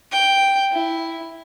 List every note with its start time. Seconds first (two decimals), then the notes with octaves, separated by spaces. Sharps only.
0.12 G5
0.72 E4